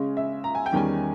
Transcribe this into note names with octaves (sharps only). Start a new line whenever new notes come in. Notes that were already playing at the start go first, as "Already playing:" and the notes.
Already playing: C#3 G#3 C#4
E5
A#5
G#5
G5
E2 D#3 G3 C#4 G#5